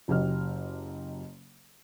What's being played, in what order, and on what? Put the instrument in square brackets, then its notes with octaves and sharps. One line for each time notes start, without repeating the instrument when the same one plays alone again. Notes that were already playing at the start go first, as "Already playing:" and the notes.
[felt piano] F#1 C#3 F#3 G4 D#5 F6